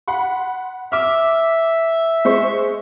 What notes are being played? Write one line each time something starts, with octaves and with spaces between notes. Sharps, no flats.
F#5 B5 C6
E5 D6 F6
G#3 C5 C#6